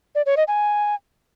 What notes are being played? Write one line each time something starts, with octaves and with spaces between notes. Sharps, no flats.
D5
C#5
D#5
G#5